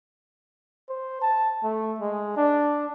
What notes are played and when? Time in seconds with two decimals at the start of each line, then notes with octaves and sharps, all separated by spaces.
0.89 C5
1.22 A5
1.63 A3
2.00 G#3
2.37 D4